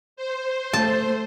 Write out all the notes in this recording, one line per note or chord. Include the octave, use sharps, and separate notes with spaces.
C5
A3 A5